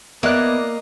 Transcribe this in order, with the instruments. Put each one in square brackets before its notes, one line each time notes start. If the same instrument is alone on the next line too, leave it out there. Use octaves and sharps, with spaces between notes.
[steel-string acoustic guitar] A#3 [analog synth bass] B3 [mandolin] E4 D5 F#6 [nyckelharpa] D#5